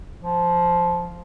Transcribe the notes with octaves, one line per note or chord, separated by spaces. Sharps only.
F3